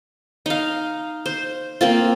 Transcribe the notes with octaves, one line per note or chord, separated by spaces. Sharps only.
D#4 F5
C5
A#3 C4 F4